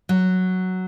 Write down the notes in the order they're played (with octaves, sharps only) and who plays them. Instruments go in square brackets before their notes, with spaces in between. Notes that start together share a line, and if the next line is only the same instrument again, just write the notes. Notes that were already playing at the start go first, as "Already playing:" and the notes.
[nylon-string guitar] F#3